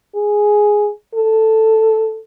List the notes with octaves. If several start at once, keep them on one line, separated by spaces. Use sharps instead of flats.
G#4
A4